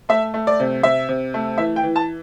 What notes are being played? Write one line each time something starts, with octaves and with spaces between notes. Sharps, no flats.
A3 E5
A3
D5
C3
C3 E5
C3
A3
E3 E5
G5
E3
A5